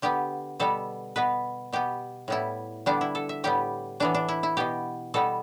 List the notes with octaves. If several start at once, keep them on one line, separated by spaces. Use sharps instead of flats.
D3 B3 G4
B2 G3 B3 A4
B2 B3 B4
B2 B3 G4
A2 G3 B3 E4
D3 G3 B3 D4
E4
A4
E5
A2 G3 B3 G4
A2 E3 B3 D4
D4
E4
E4
B2 B3 G4
B2 G3 B3 A4